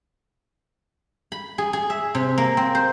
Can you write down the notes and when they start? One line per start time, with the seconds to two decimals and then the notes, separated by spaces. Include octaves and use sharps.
1.32 B5
1.58 G#4
1.73 G#4
1.90 E5
2.15 C3
2.38 A#3
2.57 C4
2.75 C5